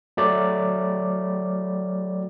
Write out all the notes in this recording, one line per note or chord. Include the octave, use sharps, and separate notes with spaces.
F#3 A3 D5